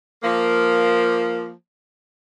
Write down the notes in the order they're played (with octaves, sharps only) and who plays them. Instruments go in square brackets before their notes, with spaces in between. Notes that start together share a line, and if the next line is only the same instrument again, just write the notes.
[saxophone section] F3 A#3